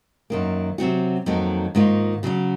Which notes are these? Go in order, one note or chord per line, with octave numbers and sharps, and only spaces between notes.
F#2 D#3 A#3
C3 F#3 C4 F#4
F2 D#3 F#3 A#3 D#4
G#2 D#3 A#3 F4
C#3 F#3 C#4 F#4